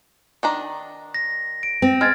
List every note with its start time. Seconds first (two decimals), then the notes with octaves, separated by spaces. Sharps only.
0.43 D#3 D4 A#5
1.14 A#6
1.63 D7
1.82 C4
2.01 G#3 F6 G#6 A6